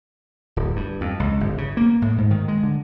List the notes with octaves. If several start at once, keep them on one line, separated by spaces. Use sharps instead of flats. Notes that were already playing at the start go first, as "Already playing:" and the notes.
D1
G2
F2
C#2
G1
C#3
A#3
A2
G#2
D#3
G#3
D3